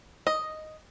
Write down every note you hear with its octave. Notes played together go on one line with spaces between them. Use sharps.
D#5